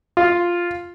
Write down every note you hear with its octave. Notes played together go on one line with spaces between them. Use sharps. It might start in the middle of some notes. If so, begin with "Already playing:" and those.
F4